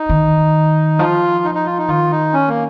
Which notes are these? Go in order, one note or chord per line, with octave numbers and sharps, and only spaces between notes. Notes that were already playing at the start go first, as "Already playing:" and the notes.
Already playing: D#4
D#3
F3 F4
D#4
D#4
F4
D#4
D#3 F4
D#4
C#4
A#3